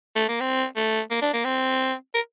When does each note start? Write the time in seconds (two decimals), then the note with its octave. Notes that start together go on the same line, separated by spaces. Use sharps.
0.16 A3
0.29 A#3
0.40 C4
0.76 A3
1.11 A#3
1.22 D4
1.34 A#3
1.45 C4
2.15 A#4